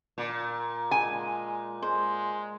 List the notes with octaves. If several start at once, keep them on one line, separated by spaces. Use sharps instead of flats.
A#2
G#3 G#5
G#3 C5